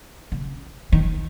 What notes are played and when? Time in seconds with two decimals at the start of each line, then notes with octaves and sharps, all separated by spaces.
0.32 C#3
0.92 D#3